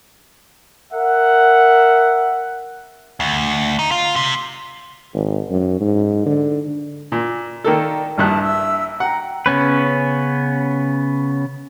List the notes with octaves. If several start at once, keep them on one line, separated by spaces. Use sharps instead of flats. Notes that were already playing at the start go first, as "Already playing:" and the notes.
A#4 E5 F#5
D2
D#4
F4
C3
G#1
F#2
G#2
D3
A#2
D#3 A#3 A4 D5
A#1 G2 E4 A5 D#6 F#6
E5 E6
F#5 G5 A#5
C#3 B3 C#4 B4